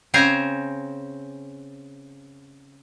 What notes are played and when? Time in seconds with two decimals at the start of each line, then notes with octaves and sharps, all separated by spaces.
0.14 C#3 C4 C5 G#5 A#5